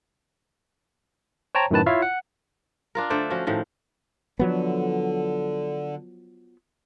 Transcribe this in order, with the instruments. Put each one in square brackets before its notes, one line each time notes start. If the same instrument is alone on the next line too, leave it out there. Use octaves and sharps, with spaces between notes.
[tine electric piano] C5 C#5 G5 A5 A#5
F#2 A2 D#3 B4 A5
E4 F4 C#5 E5 F5
F#5
[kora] D4 F4 A#4
D3 A3 C5 D5
F3 C#4 F#4
A2 D#3 F3
[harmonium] D3 [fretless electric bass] F3 F#3 B3